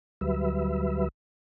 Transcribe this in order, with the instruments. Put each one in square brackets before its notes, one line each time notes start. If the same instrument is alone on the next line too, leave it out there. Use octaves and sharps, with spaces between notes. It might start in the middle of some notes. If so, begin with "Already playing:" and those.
[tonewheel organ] D2 F#3 G3 B4 E5